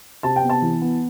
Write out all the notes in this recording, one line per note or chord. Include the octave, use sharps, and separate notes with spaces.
C3 A5
G5
B3
A5
E3
B3